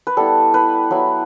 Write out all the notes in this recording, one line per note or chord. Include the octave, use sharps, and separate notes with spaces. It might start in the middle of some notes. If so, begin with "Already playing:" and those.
B4
G3 B3 E4 A4
B4
F#3 B3 E4